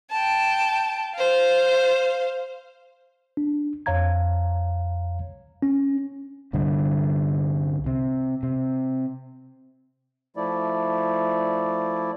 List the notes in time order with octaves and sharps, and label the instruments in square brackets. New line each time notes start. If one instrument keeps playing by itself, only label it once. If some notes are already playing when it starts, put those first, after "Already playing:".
[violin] G5 A5
C5 F5
[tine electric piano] D4
F2 C#5 F5 A#5 G#6
C#4
[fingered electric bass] C2 G2 D3
C3
C3
[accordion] F3 A3 E4 D5